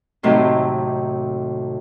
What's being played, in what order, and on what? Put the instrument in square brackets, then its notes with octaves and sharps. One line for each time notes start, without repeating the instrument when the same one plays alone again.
[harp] D#2 A2 C3 F#3 D#4